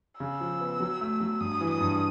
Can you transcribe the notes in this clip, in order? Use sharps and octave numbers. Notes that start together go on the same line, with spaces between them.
C#3 E6
F3
B3
F#3
A3
F#3
G2 D#6
E3
D#6
G2